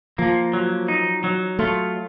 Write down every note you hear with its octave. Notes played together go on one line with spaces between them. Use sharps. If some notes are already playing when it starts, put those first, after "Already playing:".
F3 A#3
F#3
D#4
F#3
A3 F4